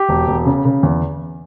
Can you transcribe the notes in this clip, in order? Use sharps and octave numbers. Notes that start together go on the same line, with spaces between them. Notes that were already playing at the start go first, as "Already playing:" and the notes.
Already playing: G4
E1
E1
C#3
C#3
E2